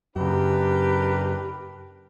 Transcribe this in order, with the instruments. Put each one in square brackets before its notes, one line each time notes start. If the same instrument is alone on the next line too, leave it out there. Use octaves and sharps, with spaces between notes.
[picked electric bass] F#2 C#3 [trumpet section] D4 A#4 B4 [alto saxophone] G4